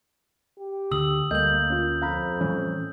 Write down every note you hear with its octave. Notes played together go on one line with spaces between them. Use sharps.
G4
D2 D3 D#6 E6 F#7
D2 G3 A3 A#3 D#5 G6 F#7
C#4 F4
F2 F5 A#5 B5
A2 E3 G3 C#4